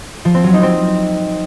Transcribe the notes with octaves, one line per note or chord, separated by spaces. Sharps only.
F3
C4
F#3
D#4
C4